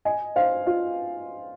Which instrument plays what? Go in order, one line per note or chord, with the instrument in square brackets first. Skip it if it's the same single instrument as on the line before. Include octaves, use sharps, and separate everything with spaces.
[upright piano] D#5 G#5
C5 F5
F4